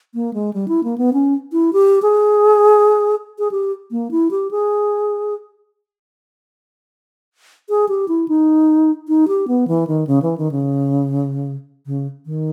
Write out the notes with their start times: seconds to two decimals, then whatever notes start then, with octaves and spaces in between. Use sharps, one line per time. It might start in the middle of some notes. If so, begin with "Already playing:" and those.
0.14 A#3
0.34 G#3
0.53 G3
0.68 E4
0.84 A#3
0.98 B3
1.13 C#4
1.52 E4
1.73 G4
2.02 G#4
3.39 G#4
3.51 G4
3.91 A#3
4.11 E4
4.31 G4
4.51 G#4
7.69 G#4
7.89 G4
8.08 E4
8.28 D#4
9.08 D#4
9.28 G4
9.48 B3
9.68 E3
9.87 D#3
10.07 C#3
10.22 E3
10.38 D#3
10.51 C#3
11.86 C#3
12.26 D#3